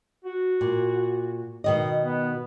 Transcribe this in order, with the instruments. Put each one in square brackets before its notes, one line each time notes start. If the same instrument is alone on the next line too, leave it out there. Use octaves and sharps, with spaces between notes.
[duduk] F#4
[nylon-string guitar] A#2
B2 D#3 D#5
[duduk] B3